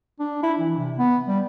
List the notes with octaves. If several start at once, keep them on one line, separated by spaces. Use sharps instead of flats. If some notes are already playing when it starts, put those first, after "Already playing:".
D4
E4
E3
C3
B3
G3